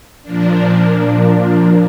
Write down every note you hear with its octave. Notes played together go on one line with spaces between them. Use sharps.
A#2 F3 A#3 D4